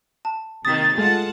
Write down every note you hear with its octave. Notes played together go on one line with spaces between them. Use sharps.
A5
C3 D#3 A#3 D#6 A6 B6
G#3 A3 F4 F#5 A5